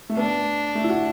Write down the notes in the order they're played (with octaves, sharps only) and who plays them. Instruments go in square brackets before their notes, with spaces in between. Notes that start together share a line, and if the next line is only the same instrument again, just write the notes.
[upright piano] A3
[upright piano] B3 [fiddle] D4
[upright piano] A3
E4
F#4